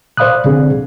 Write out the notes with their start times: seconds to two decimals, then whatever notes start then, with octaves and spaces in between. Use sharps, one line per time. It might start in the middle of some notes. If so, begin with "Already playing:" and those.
0.17 C5 D5 F5 B5 D#6 F#6
0.45 D2 D3 C4 G#4